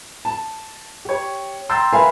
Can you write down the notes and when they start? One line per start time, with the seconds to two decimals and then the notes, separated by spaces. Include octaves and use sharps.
0.25 A5
1.05 G4 C#5
1.69 G5 A#5 C6 E6 G6 A6
1.93 A#4 B4 E5 F5 G#5 B5